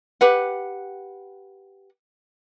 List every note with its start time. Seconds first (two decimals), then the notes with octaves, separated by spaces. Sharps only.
0.21 G4 B4 F#5